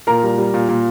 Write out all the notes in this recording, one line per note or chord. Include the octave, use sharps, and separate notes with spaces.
A#2 A#4 A#5
G3
G3
A#2
A#2